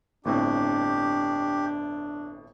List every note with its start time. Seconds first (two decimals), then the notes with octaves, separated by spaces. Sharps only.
0.25 G1 A2 C4 D4 G4